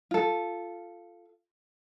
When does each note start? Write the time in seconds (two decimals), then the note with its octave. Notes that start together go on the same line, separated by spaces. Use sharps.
0.11 F4 A4